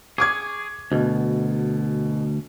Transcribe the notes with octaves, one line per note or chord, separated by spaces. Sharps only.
G#4 C#6 D6 G#6
D2 B2